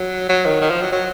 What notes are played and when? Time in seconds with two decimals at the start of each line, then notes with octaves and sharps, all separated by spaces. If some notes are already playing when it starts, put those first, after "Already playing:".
Already playing: F#3
0.29 F#3
0.46 D#3
0.61 D#3
0.70 F3
0.81 F#3
0.92 F#3